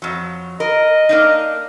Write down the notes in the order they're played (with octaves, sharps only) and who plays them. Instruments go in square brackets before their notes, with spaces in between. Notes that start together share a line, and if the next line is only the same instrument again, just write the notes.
[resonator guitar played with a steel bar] F2 F#3
[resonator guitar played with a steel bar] A#4 [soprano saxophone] D#5
[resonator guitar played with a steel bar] A#3 D4 D#4